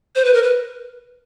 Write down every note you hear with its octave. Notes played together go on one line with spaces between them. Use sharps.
C5
B4
A#4
B4